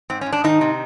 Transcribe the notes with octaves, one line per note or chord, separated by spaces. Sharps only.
G#2 C4
C#4
G#2
D4
D#3 D#4
C3